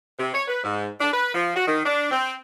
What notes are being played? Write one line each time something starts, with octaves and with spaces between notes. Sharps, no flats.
C3
C#5
B4
G#2
D4
B4
F3
F#4
D#3
D4
C4